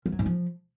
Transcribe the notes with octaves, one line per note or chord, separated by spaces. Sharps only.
F3
F#3
G#2
F3